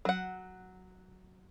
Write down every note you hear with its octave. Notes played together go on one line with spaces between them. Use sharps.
F#3 F#5